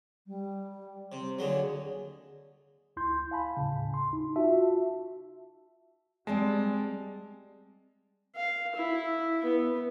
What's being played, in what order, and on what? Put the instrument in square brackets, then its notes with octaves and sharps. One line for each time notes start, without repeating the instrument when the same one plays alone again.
[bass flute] G3
[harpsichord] C3
[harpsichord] D#2 D3 F#3 [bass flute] G#4
[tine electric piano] D2 E4 C6 G6
F5 G#5 A5 B5
D#2 A2 C#3
C6
D#4
F4 F#4 E5 A5
[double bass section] G3 [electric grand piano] G#3 [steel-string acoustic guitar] C4 D5 A5
[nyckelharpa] F5
E4
B3